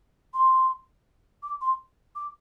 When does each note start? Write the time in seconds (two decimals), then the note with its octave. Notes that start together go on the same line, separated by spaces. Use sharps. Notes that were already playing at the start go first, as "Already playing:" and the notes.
0.34 C6
1.43 D6
1.61 C6
2.15 D6